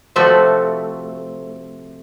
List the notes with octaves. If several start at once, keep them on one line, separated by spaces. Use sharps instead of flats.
C3 F3 A3 C4 F#4 E5